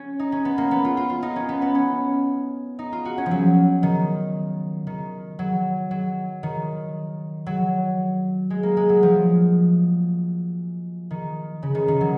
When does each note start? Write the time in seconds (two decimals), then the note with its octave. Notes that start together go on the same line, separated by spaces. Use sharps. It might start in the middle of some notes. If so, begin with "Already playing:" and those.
Already playing: C#4
0.20 D#4
0.32 C#4
0.45 B3
0.58 A#3
0.71 B3
0.85 F4
0.97 F4
1.10 F4
1.23 D#4
1.36 C#4
1.49 B3
1.62 B3
1.75 C#4
2.79 D#4
2.93 F4
3.05 F#4
3.18 C#4
3.26 F3
3.31 F#3
3.83 D#3
4.87 D#3
5.39 F#3
5.91 F#3
6.43 D#3
7.46 F#3
8.50 G#3
8.63 A#3
8.77 G#3
8.89 F#3
9.03 F3
11.11 D#3
11.63 C#3
11.75 D#3
11.88 D#3
12.01 F#3